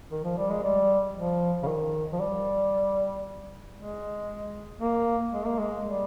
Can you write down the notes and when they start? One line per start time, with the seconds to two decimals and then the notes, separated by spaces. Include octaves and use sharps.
0.11 D#3
0.24 F3
0.38 G3
0.50 G#3
0.63 G3
1.16 F3
1.63 C#3
1.67 D#3
2.13 F3
2.20 G3
3.76 G#3
4.80 A#3
5.33 G#3
5.46 A#3
5.59 G#3
5.84 G3